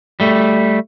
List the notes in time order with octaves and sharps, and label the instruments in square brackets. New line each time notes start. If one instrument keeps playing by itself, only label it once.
[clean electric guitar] G3 A3